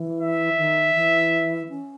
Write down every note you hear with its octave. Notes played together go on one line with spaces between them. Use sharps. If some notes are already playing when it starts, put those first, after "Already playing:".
Already playing: E3
E5
D#3
E3
C#4